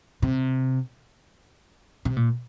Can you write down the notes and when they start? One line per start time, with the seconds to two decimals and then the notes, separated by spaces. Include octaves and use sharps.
0.22 C3
2.05 C3
2.17 A#2